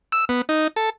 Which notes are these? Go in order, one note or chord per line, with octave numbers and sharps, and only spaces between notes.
E6
B3
D#4
A4